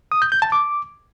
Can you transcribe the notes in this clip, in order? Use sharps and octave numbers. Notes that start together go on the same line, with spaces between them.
D#6
G6
G6
A5
D6